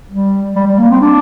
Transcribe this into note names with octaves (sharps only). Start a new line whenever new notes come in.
G3
G3
G3
A#3
C4
D4